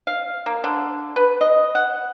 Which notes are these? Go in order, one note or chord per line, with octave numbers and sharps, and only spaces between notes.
F5
A#3
D3
B4
D#5
F#5